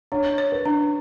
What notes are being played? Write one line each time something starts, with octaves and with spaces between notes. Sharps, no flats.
D4 C#5
C#5
B4
D4